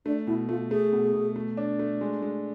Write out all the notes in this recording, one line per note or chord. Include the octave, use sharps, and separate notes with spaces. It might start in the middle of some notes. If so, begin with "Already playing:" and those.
A3 D4
B2 E4
A3 F4
A3 G#4
B2
B2
A3
D4
A3
G#3
G#3